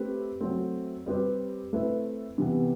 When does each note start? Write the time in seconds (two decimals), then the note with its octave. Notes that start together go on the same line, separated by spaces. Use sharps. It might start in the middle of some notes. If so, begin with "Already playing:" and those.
Already playing: A3 C4 G4 B4
0.41 F#3 A3 C4
1.06 G3 C4 G4 B4
1.73 A3 C4 E4 B4
2.38 C3 E3 B3